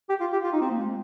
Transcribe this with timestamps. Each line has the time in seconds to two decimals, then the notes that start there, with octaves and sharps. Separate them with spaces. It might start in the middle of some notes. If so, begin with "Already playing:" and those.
0.09 G4
0.20 F4
0.33 G4
0.44 F4
0.53 D#4
0.61 C4
0.70 A#3
0.79 G#3